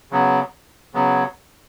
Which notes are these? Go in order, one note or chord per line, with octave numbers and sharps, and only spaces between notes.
C#3 F#3 B3
C#3 F#3 B3